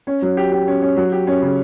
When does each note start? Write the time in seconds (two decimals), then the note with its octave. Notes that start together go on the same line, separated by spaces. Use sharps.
0.07 C#4
0.22 F#3
0.37 G4
0.52 G4
0.68 C#4
0.82 C#4
0.97 F#3
1.12 G4
1.27 C#4
1.42 C#3